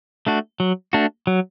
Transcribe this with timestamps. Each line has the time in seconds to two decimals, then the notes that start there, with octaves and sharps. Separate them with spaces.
0.27 A3 D4 F#4
0.60 F#3
0.93 A3 D4 F#4
1.27 F#3